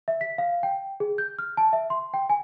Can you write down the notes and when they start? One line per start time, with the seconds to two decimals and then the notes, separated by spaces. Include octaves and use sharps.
0.08 E5
0.21 B6
0.38 F5
0.63 G5
1.00 G#4
1.18 G6
1.39 F6
1.57 A5
1.73 E5
1.90 C6
2.14 G5
2.30 G#5